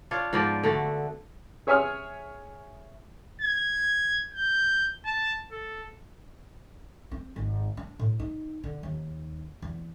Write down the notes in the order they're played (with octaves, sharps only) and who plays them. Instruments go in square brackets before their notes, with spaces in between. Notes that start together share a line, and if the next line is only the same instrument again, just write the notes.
[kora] D4 F4 C#5
G#2 F3 B3 D5
D3 A3 F#4
[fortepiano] G#4 C#5 E5 G#5 D#6 F6
[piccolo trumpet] G#6
G6
A5
A4
[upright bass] C4
G#1
D4
A2
D#4
D3
D#2
E2